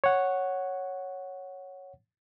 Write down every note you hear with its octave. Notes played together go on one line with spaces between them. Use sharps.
C#5 F#5